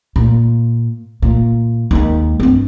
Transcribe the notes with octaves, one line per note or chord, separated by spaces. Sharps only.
A#2
A#2
D#2 G#3
G2 C4